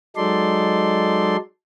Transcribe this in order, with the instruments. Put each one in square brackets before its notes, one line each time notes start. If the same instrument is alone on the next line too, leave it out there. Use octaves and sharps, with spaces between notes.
[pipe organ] F#3 G#3 D#4 A4 D5 C6